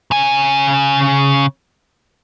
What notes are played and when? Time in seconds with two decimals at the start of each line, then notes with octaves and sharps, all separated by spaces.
0.11 C#3 G#5